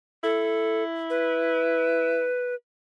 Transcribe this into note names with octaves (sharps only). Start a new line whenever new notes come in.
E4 A4
B4